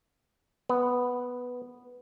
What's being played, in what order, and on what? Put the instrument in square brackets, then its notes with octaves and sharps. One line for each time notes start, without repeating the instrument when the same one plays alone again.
[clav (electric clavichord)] B3